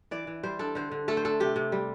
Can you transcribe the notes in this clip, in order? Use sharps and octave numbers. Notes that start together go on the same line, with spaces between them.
E3 D5
E3
G3 C5
D4 A4
D3 C5
D3
A3 A4
C5
D4 A4
C3 G4
C3
G3